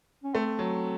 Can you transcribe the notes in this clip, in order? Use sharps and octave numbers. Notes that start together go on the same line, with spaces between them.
C#4
A3 C4
F#3